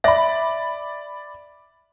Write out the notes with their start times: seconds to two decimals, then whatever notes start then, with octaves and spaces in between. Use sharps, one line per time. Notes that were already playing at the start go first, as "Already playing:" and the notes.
0.04 D5 E5 B5